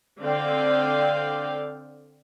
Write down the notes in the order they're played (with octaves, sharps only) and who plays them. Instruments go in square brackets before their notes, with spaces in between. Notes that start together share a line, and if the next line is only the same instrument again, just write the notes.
[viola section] D3 C4 D5 F5 G5